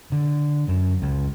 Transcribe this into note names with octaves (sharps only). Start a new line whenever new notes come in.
D3
F#2
C#2